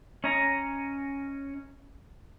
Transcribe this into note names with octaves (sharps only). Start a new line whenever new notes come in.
C#4 C#5 D#5 A#5